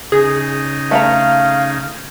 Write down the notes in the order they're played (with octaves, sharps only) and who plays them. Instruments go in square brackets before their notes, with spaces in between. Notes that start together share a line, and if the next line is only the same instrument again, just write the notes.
[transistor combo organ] C#3 D#4 [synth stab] G#4
[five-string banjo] A3 D5 A#5 [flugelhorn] F5